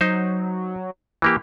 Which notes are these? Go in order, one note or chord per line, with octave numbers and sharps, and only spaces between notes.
F#3 D#4 C5
E3 A#3 G4